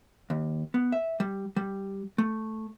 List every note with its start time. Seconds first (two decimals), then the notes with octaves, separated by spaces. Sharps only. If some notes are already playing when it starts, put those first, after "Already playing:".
0.30 D#2
0.74 B3
0.92 E5
1.20 G3
1.56 G3
2.18 A3